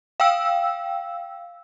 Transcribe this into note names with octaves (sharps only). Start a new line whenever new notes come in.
F5 G5 E6